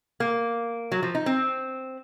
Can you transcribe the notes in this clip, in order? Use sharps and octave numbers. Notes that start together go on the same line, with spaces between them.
A#3
F#3
F3
D#4
C4